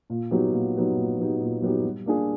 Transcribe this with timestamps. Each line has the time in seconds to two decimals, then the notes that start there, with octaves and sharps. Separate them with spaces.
0.10 A#2
0.31 F#3 B3 D#4 G4
0.53 A#2
0.75 F#3 B3 D#4 G4
0.97 A#2
1.19 F#3 B3 D#4 G4
1.40 A#2
1.62 F#3 B3 D#4 G4
1.84 G3
2.06 A#3 D4 F4 G#4